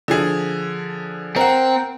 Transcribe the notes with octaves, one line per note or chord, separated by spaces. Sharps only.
D3 F3 G#4
C4 A#4 F#5